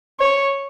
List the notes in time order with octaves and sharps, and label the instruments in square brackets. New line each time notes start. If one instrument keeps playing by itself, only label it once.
[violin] C#5